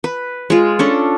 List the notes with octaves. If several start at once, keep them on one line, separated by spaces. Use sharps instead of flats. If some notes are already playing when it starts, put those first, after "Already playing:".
B4
G#3 F4
C#4 D4 A4